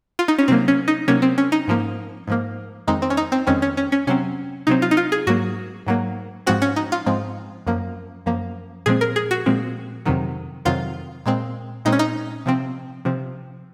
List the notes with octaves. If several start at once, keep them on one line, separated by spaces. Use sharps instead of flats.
F4
D#4
C#4
C3 F#3 A#3 C4
C#4
D#4
C3 F#3 A#3 C#4
C4
C#4
D#4
G#2 F3 A#3
G#2 F3 A#3
F2 D#3 G#3 C4 D#4
C4
C#4
D#4
C4
F2 D#3 G#3 C4 C#4
C#4
C#4
C#4
C3 F#3 C4 C#4
C3 F#3 C4 D#4
F4
D#4
F4
G#4
G#2 F#3 A#3 F#4
G#2 F#3 A#3
G#2 F3 G#3 C4 F#4
C#4
D#4
F4
G#2 F3 G#3 C4
F#2 F3 A#3
F#2 F3 A#3
A#2 F3 G#3 C4 G#4
A#4
G#4
F#4
A#2 F3 G#3 C4
F2 C3 D#3 F#3
F2 C3 D#3 F#3 F4
A#2 G#3 C4
A#2 G#3 C4 D#4
C#4
D#4
C3 F3 C4
C3 F3 C4